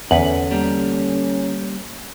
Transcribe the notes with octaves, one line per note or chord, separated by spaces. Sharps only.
E2 D3 C#4 B4 F#5
G3 A#3